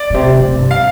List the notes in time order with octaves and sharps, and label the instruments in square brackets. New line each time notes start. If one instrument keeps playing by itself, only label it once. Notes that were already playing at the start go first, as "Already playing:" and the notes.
Already playing: [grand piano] D5
[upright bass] A#2
C3
C3
C3
G2
[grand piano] F5